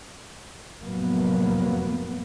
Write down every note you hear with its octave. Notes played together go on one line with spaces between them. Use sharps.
F1 A2 F#3 A#3 B3